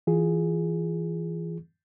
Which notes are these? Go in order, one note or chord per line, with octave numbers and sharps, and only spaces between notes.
E3 F4 G#4